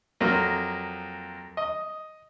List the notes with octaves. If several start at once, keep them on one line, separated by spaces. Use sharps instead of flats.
F2 F#3 A#3
D#5